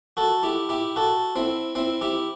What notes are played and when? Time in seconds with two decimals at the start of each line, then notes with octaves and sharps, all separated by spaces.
0.17 F#4 A4
0.43 E4 G4
0.69 E4 G4
0.96 F#4 A4
1.36 C4 E4
1.75 C4 E4
2.01 E4 G4